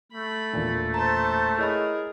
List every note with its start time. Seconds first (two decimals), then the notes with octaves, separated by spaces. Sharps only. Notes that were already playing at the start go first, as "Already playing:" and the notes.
0.12 A3 B5
0.53 E1 A#2
0.94 C5 A5 A#5
1.58 E4 G#4 A#4 C#5 D#5 B5